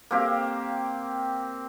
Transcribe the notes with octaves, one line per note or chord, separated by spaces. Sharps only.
A#3 C4 G4 F5